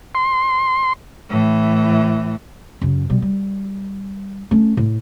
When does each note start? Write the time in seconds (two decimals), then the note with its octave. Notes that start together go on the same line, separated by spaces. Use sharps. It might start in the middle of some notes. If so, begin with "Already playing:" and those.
0.15 C6
1.30 A2 E3
2.81 F#2 C#3
3.10 B2 G3
3.22 G3
4.51 A3 C#4
4.77 A2